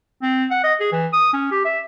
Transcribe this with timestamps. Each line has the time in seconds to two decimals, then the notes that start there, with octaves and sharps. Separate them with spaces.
0.22 C4
0.51 F#5
0.64 D#5
0.80 G#4
0.92 E3
1.13 D#6
1.33 C#4
1.51 G4
1.65 E5